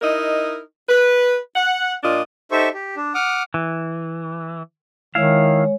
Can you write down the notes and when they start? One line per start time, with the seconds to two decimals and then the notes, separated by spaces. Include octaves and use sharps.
0.02 D#4 E4 A#4 D#5
0.88 B4
1.56 F#5
2.03 A#2 D4 F4 D#5
2.51 D#4 G4 A4 C5 E5 C#6
2.74 G4
2.96 D4
3.15 F#5 D6 D#6 F6
3.54 E3
5.15 D#3 G#3 E4 C#5 F5